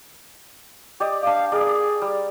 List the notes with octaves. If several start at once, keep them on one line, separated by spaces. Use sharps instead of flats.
G4 D5 D#5
D4 D5 F5
G#4 A#4 D5
G3